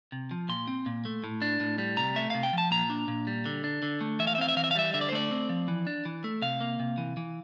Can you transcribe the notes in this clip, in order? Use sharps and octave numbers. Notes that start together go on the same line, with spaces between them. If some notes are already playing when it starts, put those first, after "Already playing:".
C3
F3
A#2 C6
C4
A#2
A3
A2
D4
A2
G3
C3 A#5
A3 E5
C3 F5
G5
F3 A5
A#2 A#5
D4
A#2
G3
D3
D4
D3
A3
E3 E5
F5
E5
C4 F5
E5
E3 F5
E5
F5
G3 E5
D3 E5
D5
C5
A3 D5
C4
F3
E3
D4
E3
A3
C3 F5
A#3
C3
E3
E3